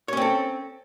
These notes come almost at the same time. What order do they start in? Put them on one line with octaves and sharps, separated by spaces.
C#5 C#4 C4 A4